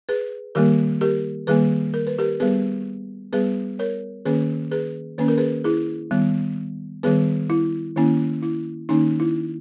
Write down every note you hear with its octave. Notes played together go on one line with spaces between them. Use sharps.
G#4 B4
D#3 G3 A#3 G4 A#4
G4 A#4
D#3 G3 A#3 G#4 B4
A#4
B4
G4 A#4
G3 B3 G#4 B4
G3 B3 G#4 B4
A#4 C#5
D#3 A#3 C#4 G#4 B4
G#4 B4
D#3 A#3 C#4 B4
A#4
G#4 B4
E4 G#4
D#3 G3 B3
D#3 G3 B3 G#4 B4
E4
D#3 A#3 C#4 E4
E4
D#3 A#3 C#4 D#4
E4